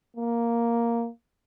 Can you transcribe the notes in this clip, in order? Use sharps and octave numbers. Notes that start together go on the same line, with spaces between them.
A#3